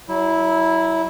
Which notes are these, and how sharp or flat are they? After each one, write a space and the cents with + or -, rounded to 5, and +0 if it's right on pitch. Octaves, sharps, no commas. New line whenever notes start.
F#3 +30 E4 -10